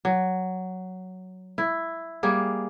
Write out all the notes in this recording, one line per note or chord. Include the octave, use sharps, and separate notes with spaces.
F#3
E4
G3 A#3 G#4